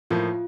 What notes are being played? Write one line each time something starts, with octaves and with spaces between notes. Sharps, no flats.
A2 F3 A#3 F4